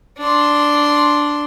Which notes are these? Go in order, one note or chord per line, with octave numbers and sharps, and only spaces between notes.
D4 C6